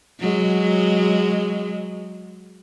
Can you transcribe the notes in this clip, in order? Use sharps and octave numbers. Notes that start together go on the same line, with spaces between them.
F#3 G#3